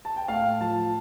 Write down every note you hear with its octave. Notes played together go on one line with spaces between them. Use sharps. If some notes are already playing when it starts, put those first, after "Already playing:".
A5
G5
A2 F5
F3 A5